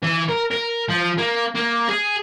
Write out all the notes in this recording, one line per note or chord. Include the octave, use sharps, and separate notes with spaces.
E3
A#4
A#4
F3
A#3
A#3
G#4